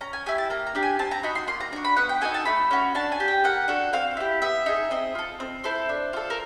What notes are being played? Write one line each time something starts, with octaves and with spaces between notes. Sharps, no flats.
C#4 A#5
G#5
E4 G4 G#5
A5
A#3 A#5
A#5
D4 G4
G#5
C4 A5
A#5
D#4 F#4 B5
C6
A#3 C6
A#5
D4 F#4 A#5
B5
B3 F#5
G5
D#4 F#4 A4 G#5
A5
A3 B5
C#4 F#4
D4 A5
G#5
G4
G5
A#3 F#5
D4 F#4 A4
C4 F5
E4 G4
B3 E5
D#4 G#4
C4 D#5
F4 A4
C4
E4 A4 C5
D4
F4 A4
A#4